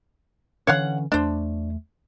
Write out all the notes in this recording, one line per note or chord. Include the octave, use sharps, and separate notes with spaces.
D3 E3 C#4 C#5 F5 F#5
E2 A3 D4 C5